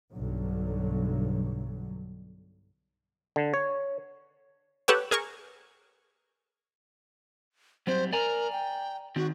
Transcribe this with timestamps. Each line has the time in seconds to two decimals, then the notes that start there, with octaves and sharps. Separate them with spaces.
0.12 B1 G2 D3 F#3
3.36 D3
3.54 C#5
4.88 G4 A4 B4 C#5 F#5 G5
5.11 G#4 A#4 G#5 C#6
7.87 F#3 G3 C4 C5
8.13 A#4 D5 G#5 A#5
8.52 G5
9.16 D#3 C4 F#4